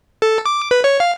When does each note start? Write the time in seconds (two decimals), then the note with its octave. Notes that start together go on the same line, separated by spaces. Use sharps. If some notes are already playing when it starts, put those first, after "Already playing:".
0.22 A4
0.46 D6
0.71 B4
0.84 C#5
1.00 F5